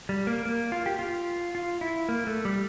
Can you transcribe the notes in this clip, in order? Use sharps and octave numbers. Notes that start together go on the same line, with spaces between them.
G3
A#3
A#3
F4
G4
F4
F4
E4
A#3
A3
G3